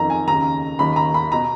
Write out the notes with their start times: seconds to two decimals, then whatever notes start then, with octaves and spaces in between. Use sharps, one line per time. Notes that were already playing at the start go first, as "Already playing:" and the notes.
Already playing: F2 D#3 A#5
0.10 G#5
0.27 D#2 C#3 A#5
0.79 D#2 D#3 B5
0.96 A#5
1.14 B5
1.32 B2 A#5